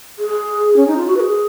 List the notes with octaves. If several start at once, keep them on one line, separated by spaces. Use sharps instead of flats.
G#4
C#4
D#4
F4
F#4
B4
G#4